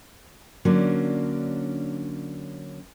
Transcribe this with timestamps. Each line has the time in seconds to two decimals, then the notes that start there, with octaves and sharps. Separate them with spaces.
0.65 D3 F#3 A#3 C#4 D4